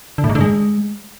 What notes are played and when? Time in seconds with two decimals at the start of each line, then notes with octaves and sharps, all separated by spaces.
0.18 D3
0.24 A2
0.29 G#2
0.35 D3
0.41 G#3